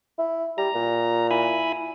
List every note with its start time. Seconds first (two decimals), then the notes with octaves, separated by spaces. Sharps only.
0.19 E4
0.58 G3 A#5
0.75 A#2
1.31 E4 G#5 B5